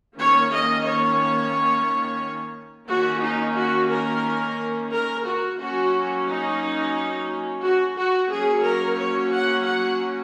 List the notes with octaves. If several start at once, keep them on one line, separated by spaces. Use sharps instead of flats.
D#3 A#3 C#4 C#5
D#5
C#5
D#3 A#3 C#4 F#4
D#4
F#4
A#4
A#4
F#4
F#3 A#3 C#4 F#4
D#4
F#4
F#4
F#3 A#3 C#4 G#4
A#4
C#5
F#5
F#5